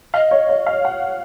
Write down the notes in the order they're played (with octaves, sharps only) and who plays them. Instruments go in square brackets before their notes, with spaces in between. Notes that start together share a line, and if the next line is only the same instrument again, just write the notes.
[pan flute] D#5 [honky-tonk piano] F5
[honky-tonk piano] C#5
C#5
F5
F#5